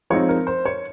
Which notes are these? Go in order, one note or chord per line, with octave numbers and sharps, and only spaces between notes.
F3 G#3 C4 D#4 C#5
A#4
C5
C#5